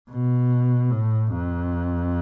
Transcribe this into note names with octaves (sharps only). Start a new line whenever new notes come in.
B2
A2
F2